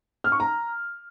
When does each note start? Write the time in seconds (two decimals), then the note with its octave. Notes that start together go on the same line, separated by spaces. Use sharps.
0.24 F6
0.32 C#6
0.40 A#5